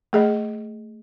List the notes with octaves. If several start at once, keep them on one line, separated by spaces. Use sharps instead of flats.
A3 G#4 D#5